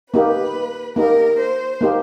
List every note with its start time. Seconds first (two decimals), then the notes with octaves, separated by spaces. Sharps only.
0.13 A#3 D#4 G4 B4
0.96 A#3 D#4 G4 A#4
1.38 C5
1.81 A#3 D#4 G4